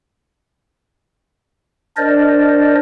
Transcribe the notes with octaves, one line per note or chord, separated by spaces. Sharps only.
D4 A#4 C5 D5 D#5